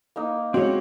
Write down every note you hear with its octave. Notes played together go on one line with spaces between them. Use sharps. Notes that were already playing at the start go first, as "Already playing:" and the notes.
A#3 D#4
G#3 C4 F#4 C#5